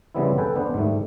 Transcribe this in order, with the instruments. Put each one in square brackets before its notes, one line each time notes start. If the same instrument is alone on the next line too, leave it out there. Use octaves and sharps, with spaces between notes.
[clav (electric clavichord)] C#3 F3 G3 B3 C4 E4
A4 B4 G5 G#5
B3 D4 B4 C5
G#2 D#3 G3 A3